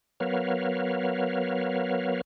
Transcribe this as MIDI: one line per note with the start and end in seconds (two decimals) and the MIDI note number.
0.20 2.21 54
0.20 2.21 59
0.20 2.21 70
0.20 2.21 71
0.20 2.21 73
0.20 2.21 77